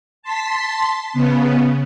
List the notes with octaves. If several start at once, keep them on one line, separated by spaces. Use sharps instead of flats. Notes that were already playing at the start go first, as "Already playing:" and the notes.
A5 C6 B6
C#3 B3